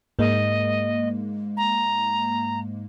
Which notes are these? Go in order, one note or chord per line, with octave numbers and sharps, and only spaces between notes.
G#2 G#3 A#3 D#5
A#5